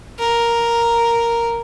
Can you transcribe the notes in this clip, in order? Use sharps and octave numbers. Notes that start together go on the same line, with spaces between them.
A#4